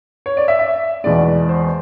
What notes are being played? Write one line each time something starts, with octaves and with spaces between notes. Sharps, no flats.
C#5
D5
E5
E5
E2 B2 G#3 D5
C5